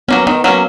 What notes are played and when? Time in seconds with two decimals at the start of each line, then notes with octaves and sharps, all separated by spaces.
0.08 F#3 A#3 B3 C#4
0.27 D#3 B3
0.44 F#3 A#3 C#4